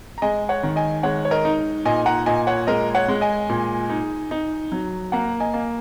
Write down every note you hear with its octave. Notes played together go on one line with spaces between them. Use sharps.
A#5
G#3 D#5 G#5
C#5 F#5
D#3
D#5 G#5
G#3 C#5 F#5
C#5
A#4 D#5
D#4
A#2 D#5 G#5
F#5 A#5
A#2 D#5 G#5
C#5 F#5
G#3 A#4 D#5
C#5 F#5
G#3
D#5 G#5
A#2
D#4
D#4
F#3
A#3 F#5 A#5
D#5 G#5
A#3